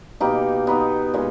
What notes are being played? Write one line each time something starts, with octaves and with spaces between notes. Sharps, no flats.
B2 A#3 D#4 G4
B3 D#4
A#2 G#3